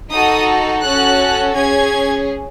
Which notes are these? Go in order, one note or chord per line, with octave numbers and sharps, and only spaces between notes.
D#4 F#4 A4 D#6
C#4 F#4 A4 F#6
C#4 G#4 G#6